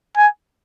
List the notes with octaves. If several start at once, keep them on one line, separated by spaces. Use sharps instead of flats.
G#5